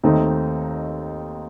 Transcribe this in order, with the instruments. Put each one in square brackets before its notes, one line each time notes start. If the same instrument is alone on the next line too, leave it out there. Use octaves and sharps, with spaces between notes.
[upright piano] D#2 D#3 A3 C4 D#4